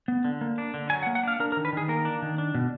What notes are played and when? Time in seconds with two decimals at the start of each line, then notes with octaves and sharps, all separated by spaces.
0.08 B3
0.25 D3
0.41 A#3
0.58 D4
0.74 D3
0.90 F#3 G#5
1.03 F#5
1.07 A#3
1.15 F#5
1.23 D4 F5
1.40 D4 A#4
1.52 A#4
1.57 D#3
1.65 B4
1.73 D#3 G#4
1.88 A#3 A#4
2.05 D4
2.22 D#3
2.38 D4
2.55 B2